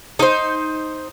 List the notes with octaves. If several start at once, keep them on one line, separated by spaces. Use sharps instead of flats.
D#4 C5